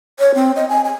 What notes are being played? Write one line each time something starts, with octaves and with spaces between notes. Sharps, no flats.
C#5
C4
D#5
G#5
G#5